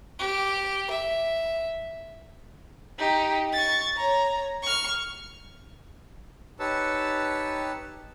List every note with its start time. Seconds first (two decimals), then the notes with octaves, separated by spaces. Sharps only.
0.19 G4
0.89 E5
2.98 D#4 G4
3.53 C#6 A6
3.97 C#5 A#5
4.63 C#6 F6
6.59 D#4 G4 B4 C#5 A5 E6